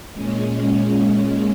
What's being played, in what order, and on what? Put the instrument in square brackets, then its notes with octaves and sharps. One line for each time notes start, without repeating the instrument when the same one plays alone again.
[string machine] A#2 G#3 C#4